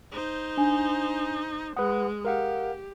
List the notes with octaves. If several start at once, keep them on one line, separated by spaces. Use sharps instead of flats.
D#4 C5
D4 G#5
G#3 B4 F#5 D#6
G4 A#4 F5 F#5